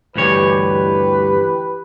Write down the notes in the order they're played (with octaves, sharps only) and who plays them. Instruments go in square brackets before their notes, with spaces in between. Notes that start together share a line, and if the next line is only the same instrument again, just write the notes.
[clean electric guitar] D2 G2 C#5 [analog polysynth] E3 G4 [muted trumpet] B4